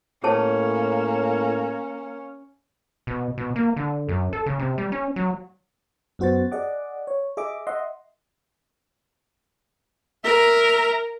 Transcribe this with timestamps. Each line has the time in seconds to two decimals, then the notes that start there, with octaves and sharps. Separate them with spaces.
0.24 A2 A#3 C#4 G#4 C#5 A5
3.07 B2
3.38 B2
3.56 A#3
3.76 D3
4.09 F#2
4.33 A4
4.46 C#3
4.59 C3
4.78 G3
4.92 C#4
5.16 F#3
6.19 F#2 B3 F#4 C5 F#5 A6
6.51 G#4 D5 D#5 F#5 D6
7.07 C#5
7.37 G#4 D#5 E5 D6
7.67 D#5 E5 F#5 C6
10.24 A#4 E5